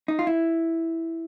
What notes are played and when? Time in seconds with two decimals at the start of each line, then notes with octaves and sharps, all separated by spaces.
0.08 D#4
0.19 F4
0.27 E4